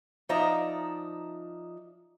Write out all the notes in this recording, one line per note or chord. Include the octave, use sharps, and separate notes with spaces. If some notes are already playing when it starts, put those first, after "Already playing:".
F3 D#4 D5 E5 A#5